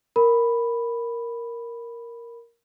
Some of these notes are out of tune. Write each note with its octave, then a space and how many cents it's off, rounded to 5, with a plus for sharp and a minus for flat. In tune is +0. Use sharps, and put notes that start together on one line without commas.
A#4 +0 B5 +0